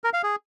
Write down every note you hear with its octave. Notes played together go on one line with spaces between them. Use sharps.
A#4
F5
G#4